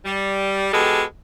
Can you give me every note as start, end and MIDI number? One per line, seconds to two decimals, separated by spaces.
0.05 0.69 55
0.72 1.03 47
0.72 1.03 56
0.72 1.03 67
0.72 1.03 69